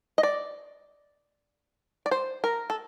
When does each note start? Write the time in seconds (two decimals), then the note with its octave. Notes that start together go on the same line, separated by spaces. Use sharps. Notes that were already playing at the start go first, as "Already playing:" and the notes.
0.18 D#5
0.23 D5
2.06 D5
2.11 C5
2.44 A#4
2.70 A4